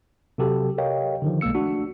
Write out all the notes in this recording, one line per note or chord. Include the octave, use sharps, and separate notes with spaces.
C3 F#3 F#4 G4 A4
G4 A#4 C#5 D#5 F5 G5
D3 D#3 F3
B1 G#3 A#3 E6 C#7
A3 D4 F#4